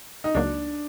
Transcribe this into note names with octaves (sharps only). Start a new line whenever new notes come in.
D#4
C#2 C#3 F#3 A#3 D4